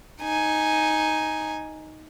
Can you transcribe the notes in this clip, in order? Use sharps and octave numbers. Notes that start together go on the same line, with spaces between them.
D#4 G#5